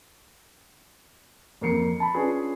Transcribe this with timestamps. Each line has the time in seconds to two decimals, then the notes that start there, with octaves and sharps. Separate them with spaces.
1.61 F2 A#3 C7 C#7
2.00 A5 B5
2.14 C#4 D4 F4 G#4 B4